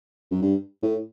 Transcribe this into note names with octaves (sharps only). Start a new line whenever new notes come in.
F#2
G2
A2